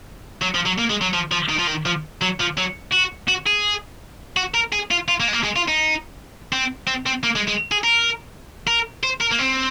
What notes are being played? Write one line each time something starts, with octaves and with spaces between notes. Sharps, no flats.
F#3
F3
F#3
A#3
G#3
F#3
F3
F3
D#3
F3
D#3
F3
F#3
F3
F#3
F#4
F#4
G#4
F#4
A#4
G#4
F4
F4
A#3
G#3
A#3
G#3
F4
D#4
C4
C4
C4
A#3
G#3
G#3
G#4
A#4
A#4
C5
A#4
A#3
C4